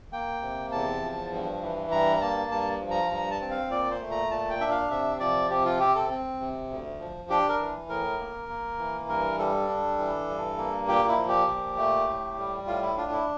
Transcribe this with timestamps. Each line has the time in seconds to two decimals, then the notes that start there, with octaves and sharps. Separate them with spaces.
0.12 A#3 G5
0.42 C3
0.72 E2 A5
1.02 F3
1.32 G2
1.62 E3
1.91 G2 A#5
2.17 A#5
2.21 A#3 A5
2.51 G2 A5
2.81 F3
2.91 A#5
3.11 G2 A#5
3.31 A5
3.41 C4
3.51 F5
3.70 A#2 D5
3.91 C5
4.01 A3
4.11 A#5
4.31 A#2 A5
4.50 G5
4.61 D4 E5
4.71 F5
4.91 C3 E5
5.20 F3 D5
5.50 C3 G4
5.65 F4
5.80 C4 G4
5.95 A4
6.10 C4
6.40 C3
6.69 D2
7.00 F3
7.30 D4 G4
7.49 A#4
7.60 E3
7.89 A2 A#4
8.19 A#3
8.49 A#3
8.79 E3
9.08 G2 A#4
9.39 G3 A4
9.69 D4
9.98 E3
10.28 G2
10.58 A#3
10.88 A#2 G4
11.08 E4
11.18 F3
11.28 G4
11.48 A#2
11.78 A3
12.08 A2
12.38 G3
12.67 A2 F4
12.82 E4
12.97 D4 F4
13.12 E4